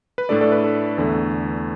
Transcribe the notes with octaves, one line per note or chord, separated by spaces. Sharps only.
B4
A2 A3 D4 A4 D5
A4 D5
B4
A4
E2 D3 A3